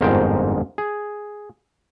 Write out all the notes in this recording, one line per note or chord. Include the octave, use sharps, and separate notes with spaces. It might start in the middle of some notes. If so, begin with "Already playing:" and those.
G1 F2 G#2 A#4 C5 G5
G#4